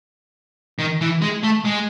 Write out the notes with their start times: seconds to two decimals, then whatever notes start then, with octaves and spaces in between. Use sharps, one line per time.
0.79 D#3
1.01 E3
1.22 G#3
1.43 A3
1.65 G#3